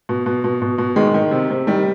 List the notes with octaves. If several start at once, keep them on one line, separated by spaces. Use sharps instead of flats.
B2
B2
B2
B2
B2
D#3 G#3
D#3
C3
C3
D#3 G3